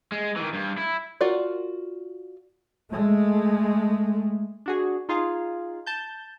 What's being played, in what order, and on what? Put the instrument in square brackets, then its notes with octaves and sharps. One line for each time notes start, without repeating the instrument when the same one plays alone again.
[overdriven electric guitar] G#3
D#3 E3
G2
E4
[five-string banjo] F4 F#4 A#4 D5
[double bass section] G#3 A3
[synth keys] D4 F#4 G#4
D#4 F4 G#4 F5
A5 G6